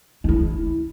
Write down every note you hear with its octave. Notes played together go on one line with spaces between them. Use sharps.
D#4 E4